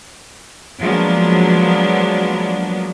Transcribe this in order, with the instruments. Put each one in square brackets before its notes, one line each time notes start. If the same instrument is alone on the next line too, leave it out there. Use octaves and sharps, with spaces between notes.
[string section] F3 F#3 G#3 A#3 B3 D4